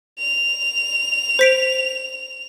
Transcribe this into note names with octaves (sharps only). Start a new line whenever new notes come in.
F7
C5 B6 D7